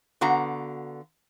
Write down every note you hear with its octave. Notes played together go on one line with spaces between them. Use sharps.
D3 B3 F#4 F5 A#5